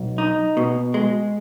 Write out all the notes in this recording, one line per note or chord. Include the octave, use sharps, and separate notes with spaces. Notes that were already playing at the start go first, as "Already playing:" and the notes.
Already playing: B1
D#4
B2
G#3